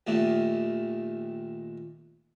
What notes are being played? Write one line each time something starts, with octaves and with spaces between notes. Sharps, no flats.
D#2 A#2 D#3 A3